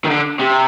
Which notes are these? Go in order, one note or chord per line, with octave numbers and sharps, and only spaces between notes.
D#3
D3
C3